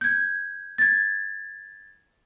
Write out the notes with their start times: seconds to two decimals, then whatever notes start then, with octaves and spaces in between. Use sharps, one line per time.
0.01 G6 G#6
0.78 G#6 A6